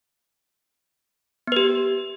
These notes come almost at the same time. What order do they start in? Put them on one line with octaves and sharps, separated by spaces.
B3 B4 G4